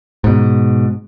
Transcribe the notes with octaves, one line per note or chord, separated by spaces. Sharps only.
G#2 B2